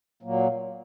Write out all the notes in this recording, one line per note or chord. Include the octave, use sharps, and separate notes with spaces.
A#2 F#3 A#3